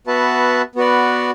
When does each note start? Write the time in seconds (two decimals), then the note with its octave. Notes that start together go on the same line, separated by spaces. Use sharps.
0.07 B3 F#4 B4 E5 A5
0.75 B3 F#4 B4 D5